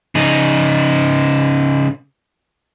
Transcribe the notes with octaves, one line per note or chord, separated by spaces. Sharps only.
C#3 D#4